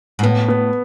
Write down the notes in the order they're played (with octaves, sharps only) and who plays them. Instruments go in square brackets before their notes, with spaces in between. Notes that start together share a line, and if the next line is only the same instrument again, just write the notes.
[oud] G#2
[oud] A2 [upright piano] B3
[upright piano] B3